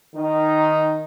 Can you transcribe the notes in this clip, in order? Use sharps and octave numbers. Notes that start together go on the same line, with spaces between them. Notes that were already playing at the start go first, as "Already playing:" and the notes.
D#3 D#4